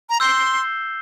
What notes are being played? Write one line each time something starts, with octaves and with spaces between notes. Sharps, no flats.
A#5
C6 E6 G6 C7 E7 G7